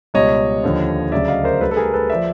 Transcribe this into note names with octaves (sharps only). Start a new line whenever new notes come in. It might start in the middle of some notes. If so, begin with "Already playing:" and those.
C#2 B2 G3 C#5 D#5
D#2 D3 F3
D2 C#3 F#3 D5 E5
D#5 F5
A#4 C5
D2 D3 G3 A4 B4
A4
G#4 A#4
A4 B4
F3 D5 E5